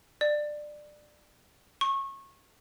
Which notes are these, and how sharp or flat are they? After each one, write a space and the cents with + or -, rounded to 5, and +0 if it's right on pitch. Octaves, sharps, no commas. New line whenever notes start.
D5 +20
C#6 -25